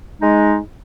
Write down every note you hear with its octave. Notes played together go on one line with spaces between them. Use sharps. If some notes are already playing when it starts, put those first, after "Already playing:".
G#3 D#4